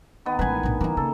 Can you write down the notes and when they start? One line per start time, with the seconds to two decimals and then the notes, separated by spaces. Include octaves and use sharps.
0.26 D#3 B3
0.39 A1 G#3 B4 G#5
0.63 A#1 A2
0.81 D#3 E3 A#3
0.97 C#3 A4